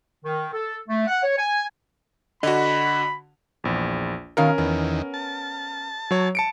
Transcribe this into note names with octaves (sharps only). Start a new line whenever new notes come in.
D#3
A4
A3
F#5
C#5
G#5
D3 F#4 D#5 B5
A#1 E2
B2 D#3 C#4 A#4 F5
E2 D#3 B3
A5
F#3 C#5
A5 C#7 D7